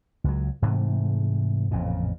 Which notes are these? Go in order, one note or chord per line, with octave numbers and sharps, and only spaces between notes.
C#2 F#3
G#2 C3 E3 A3
A1 F2 A#2 C#3